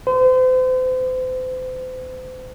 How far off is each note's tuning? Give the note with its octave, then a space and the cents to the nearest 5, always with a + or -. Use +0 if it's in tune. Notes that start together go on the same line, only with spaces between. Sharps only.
C5 -35